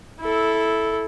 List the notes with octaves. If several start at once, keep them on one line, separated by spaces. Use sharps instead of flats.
E4 A4